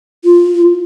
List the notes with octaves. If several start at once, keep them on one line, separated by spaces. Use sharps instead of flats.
F4